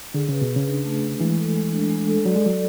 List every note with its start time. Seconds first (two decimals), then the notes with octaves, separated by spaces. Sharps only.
0.14 D3 G#4
0.29 C#3 B4
0.41 B2
0.50 B4
0.56 C#3
0.67 D4
0.85 A3
1.03 A3
1.20 E3 G#3
1.38 A4
1.55 G#3
1.72 D4
1.90 G#3
2.08 A4
2.25 F#3 D5
2.36 G#3
2.43 F#3 D5